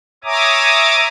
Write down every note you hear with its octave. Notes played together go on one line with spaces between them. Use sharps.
C#5 E5 G#5 A#5 D6 D#6